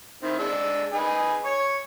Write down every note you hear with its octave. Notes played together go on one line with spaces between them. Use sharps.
D#3 C4 E4
G#3 D4 E6
D#4 G#4 B4
C#5 C#6